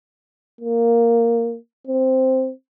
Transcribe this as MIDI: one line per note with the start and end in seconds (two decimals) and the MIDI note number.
0.61 1.57 58
1.87 2.52 60